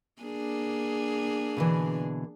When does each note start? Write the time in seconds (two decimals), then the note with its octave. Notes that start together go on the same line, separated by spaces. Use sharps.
0.22 A#3 D4 G#4
1.57 B2 D3 E3